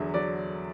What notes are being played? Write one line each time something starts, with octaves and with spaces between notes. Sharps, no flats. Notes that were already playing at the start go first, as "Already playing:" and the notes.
Already playing: E2 D3 F#3 E5
F#3 D5